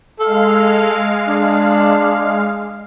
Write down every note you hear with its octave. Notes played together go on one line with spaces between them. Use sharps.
G#3 A4 F5
D4